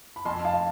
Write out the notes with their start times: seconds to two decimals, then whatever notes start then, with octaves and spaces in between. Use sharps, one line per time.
0.16 B5
0.25 F2 A5 C6
0.45 F5 A5